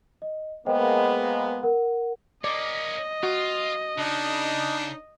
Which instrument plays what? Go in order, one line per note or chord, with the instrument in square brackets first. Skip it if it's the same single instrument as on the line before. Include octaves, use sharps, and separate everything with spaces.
[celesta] D#5
[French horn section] G#3 A#3 B3 [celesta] C5 D#5 G5
[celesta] A#4 F#5
[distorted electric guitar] A#3 C#4 [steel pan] D5 [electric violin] D#5
[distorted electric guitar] F4 [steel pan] F#4
[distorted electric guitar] C#3 [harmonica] D4 D#4